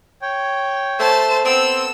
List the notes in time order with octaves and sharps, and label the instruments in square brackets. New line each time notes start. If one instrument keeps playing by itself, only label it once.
[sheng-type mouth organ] C#5 G5
[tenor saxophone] A3 [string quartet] C5 A5
[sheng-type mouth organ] B3 A4 [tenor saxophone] C4 [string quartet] E6